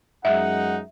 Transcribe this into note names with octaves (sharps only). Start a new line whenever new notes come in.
F#2 G#3 D#4 E5 F#5